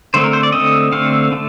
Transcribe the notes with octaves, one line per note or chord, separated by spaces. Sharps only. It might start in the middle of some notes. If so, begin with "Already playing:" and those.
D3 A3 C4 C5
A#4
C5
D5
D3 A3 C4 D#5
D3 A3 C4 F5
D3 A3